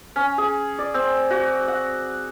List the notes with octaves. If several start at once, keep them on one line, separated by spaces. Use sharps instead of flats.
C#4
G#4
D5
C4
F#4
F#5